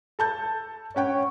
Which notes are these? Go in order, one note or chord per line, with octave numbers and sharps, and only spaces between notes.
A4 A5 G6
C#4 C#5 F#5 G5